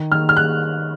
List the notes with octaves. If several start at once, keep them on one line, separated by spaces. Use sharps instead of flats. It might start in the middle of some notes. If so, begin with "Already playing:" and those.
Already playing: D#3
D#3 F6
F6
D#3 F#6